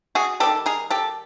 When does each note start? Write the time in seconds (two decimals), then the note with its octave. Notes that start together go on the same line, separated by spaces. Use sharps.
0.15 F#4 G#4
0.40 B3 G4 A4
0.43 D#3 G3
0.66 G#4 A#4
0.90 G4 A4